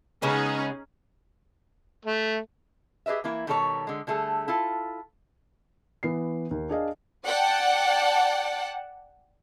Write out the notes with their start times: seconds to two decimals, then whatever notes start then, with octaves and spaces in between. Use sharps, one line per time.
0.22 C#3 G#3 B3 C#4 D#4 G#4
2.05 A3
3.06 G4 G#4 B4 D#5 E5
3.24 E3 A#3 E4
3.47 B2 D#3 G3 A4 B4 C#5
3.87 D3 G#3
4.07 D3 G3 A3 G#4 A4
4.48 E4 F4 A4
6.03 E3 B3 C7
6.51 D#2
6.69 D4 G#4 D#5 F5
7.25 D5 F#5 G5 A5